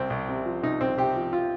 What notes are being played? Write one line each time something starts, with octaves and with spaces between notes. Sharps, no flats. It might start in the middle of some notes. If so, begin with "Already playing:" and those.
Already playing: C2 C4
C2
C3
F3
C2 D#4
C2 C4
C3 G4
F3
F4